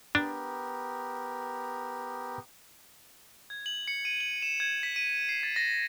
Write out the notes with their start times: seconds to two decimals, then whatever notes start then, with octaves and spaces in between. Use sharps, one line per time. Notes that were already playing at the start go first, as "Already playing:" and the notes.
0.15 B3 D4 G4 A#4
3.50 G#6
3.66 F#7
3.88 C#7
4.05 D#7
4.21 F#7
4.42 E7
4.60 G#6
4.83 B6
4.96 D#7
5.29 C7
5.43 A6
5.56 A#6